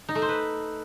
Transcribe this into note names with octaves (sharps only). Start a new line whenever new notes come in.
D#4
A3
C5
B4